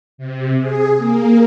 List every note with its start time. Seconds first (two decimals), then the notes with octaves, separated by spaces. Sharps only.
0.18 C3
0.61 G#4
0.98 A#3